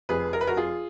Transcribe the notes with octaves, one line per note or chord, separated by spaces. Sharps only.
F1 F2 F3 G#4 B4
A#4
B4
F#4 A#4
F4 G#4